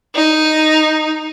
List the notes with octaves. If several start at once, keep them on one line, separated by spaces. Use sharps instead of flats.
D#4